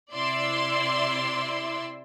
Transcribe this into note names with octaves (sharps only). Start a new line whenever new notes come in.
C3 E4 D5 E5 C6 E6